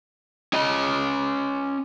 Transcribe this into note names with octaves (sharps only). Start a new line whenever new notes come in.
C#4 D#5